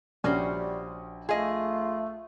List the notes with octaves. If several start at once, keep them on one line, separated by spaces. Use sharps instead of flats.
A#1 G3 C#4 F#4 C5
A3 F4 G#4 D#5